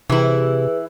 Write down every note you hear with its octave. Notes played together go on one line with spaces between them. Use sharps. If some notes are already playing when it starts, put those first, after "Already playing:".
C3 E3 E4 G#4 B4